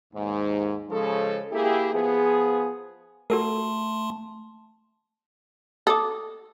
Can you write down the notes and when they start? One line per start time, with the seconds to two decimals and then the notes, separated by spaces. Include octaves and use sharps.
0.13 D#2 G#2
0.90 C#3 F3 G#3 A4
1.52 A#3 E4 G4 G#4
1.94 F3 B3 G#4
3.30 A3 F#4 A4 A#4 A5 C6
5.87 A4 D6 D#6